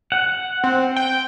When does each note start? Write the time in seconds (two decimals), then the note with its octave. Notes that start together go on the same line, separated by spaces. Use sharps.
0.12 F#5
0.64 C4
0.97 G5